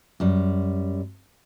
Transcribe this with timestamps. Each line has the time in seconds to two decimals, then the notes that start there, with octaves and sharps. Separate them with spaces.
0.20 F#2 G3